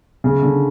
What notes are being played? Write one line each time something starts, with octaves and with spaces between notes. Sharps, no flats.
C#3
D3